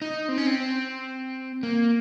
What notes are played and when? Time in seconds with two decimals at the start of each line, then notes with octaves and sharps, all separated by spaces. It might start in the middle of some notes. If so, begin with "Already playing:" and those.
0.02 D#4
0.29 C4
0.38 C#4
0.47 C4
1.63 A#3